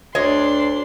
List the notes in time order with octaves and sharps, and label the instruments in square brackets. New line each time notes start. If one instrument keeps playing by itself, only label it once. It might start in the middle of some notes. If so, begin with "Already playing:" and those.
[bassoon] D2 [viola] D4 C6 [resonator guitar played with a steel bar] C#5 D#5